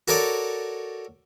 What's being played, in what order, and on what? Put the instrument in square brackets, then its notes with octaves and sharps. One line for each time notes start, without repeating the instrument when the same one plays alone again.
[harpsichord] F#4 A4 A#4 C#5 D5